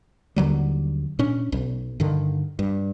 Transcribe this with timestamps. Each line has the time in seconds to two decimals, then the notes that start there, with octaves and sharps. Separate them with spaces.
0.36 D#2 D3 F#3 G3
1.19 A#2 C#4 D4
1.52 B1
2.00 G2 D3 D#3
2.59 G2